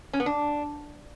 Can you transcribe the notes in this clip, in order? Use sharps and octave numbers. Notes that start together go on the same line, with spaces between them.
C#4
B3
D4